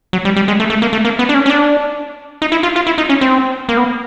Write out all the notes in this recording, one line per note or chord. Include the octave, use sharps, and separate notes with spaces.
F#3
G3
G3
G#3
A3
A3
A#3
A3
A#3
B3
D4
C#4
C#4
D4
D#4
E4
F4
F4
E4
D#4
C#4
C4
A#3
B3